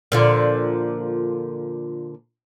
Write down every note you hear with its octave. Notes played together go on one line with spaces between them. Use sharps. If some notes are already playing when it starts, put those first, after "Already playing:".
A#2 D3 F3